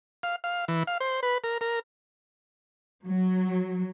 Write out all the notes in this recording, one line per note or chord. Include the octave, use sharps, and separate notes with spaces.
F5
F5
E3
F5
C5
B4
A#4
A#4
F#3